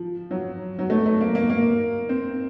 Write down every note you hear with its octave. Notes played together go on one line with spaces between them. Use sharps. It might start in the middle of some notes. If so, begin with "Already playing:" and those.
Already playing: F3
F#3
F#3
A3
A3
A#3
A#3
A#3
C4